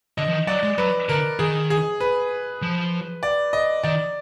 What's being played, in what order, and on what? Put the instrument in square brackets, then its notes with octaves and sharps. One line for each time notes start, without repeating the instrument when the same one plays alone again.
[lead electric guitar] D3 [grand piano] D#5
[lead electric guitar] F3
D#3
[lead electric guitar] F#3 [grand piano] D5
[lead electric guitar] G#3
[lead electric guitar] F#3 [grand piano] B4
[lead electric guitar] D3 [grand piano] A#4
[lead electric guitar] D#3 [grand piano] G#4
[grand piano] G#4
B4
[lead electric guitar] F3
[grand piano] D5
D#5
[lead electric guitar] D#3 [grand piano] D5